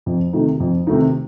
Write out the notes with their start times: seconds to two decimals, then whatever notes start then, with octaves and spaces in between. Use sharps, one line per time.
0.06 F2
0.33 C3 D#3 A3 D#4
0.60 F2
0.87 C3 D#3 A3 D#4